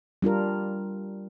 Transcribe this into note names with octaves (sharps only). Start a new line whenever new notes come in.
G3 D4 F4 A#4